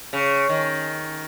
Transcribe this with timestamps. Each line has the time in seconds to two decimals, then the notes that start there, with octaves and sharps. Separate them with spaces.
0.13 C#3
0.49 D#3